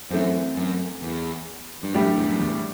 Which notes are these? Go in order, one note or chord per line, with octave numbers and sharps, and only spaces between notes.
F#2 E3 A3 C4
F#2
E2
G2
F#2 A2 G3 D4 G4
E2
F#2
E2